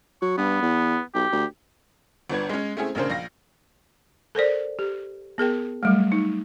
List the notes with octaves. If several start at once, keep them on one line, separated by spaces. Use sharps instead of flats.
F#3 C#6
G2 B3
E2
B1 G4
D2
G1 B3 D4 B4 G#6
G#3 C#4
A3 C4 C#4 E4 G#4
A1 C#3 A#3 C#4 D4 C5
A#1 F5 A#6
A4 A#4 C5 D5
G4
B3 G#4 A#4 G5
F#3 G3 A3
D#4